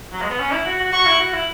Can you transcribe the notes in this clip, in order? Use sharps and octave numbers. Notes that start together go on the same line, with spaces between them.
F#3
G#3
B3
C#4
E4
F#4
F#4
F#4 C#6
E4
F#4
E4